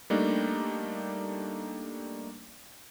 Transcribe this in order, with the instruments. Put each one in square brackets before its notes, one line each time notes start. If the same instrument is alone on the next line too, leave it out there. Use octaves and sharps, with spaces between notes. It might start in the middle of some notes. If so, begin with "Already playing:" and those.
[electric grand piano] G3 A3 A#3 D4 D#4